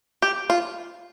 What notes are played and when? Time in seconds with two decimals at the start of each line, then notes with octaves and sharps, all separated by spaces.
0.22 G4
0.50 F4